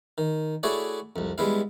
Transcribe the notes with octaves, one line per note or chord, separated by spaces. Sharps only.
D#3
A3 E4 F#4 G#4 C#5 D5
C2 F2
G3 G#3 B3 E4 F5